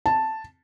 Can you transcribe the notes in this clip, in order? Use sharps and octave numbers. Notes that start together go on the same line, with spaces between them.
A5